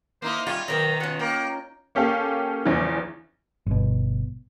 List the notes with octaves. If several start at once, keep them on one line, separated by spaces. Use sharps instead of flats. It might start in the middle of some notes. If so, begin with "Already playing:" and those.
A#3 D#4 E4 C5
G3 C#4 F4
B2 D#3 F#3 A#4 G5 A#5
C#4 F4 F#5
A#3 G5
A#3 C#4 G4 A4 F5
A#1 E2 C#3 E3 F3
G1 B2